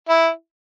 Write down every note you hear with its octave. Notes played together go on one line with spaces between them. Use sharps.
E4